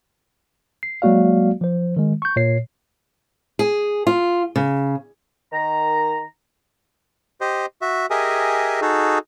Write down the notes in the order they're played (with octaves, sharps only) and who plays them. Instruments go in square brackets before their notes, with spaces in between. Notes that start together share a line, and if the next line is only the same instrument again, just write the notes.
[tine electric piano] C7
F#3 G#3 A#3 F#4 D5 F5
F3 C5
D#3 G#3
C#6 G6
A#2 C#5 C7
[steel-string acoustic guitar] G#4
F4
C#3
[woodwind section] D#3 A#5
[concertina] G4 C5 D#5
F#4 E5
G4 G#4 A#4 D#5 E5 G#5
D#4 F#4 G#4 A4